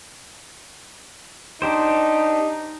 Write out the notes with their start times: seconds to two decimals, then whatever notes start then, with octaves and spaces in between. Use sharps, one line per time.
1.62 D4 D#4 G4 C5